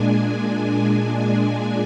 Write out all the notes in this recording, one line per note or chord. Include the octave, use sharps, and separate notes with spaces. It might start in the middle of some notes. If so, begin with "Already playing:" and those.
Already playing: A#2 G#3 D4 G#5
G#5